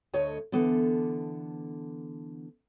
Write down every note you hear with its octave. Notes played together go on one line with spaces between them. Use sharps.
D2 A3 C#5 D#5
D3 E3 B3 A4